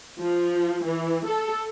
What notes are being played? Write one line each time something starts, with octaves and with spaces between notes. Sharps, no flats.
F3
E3
A4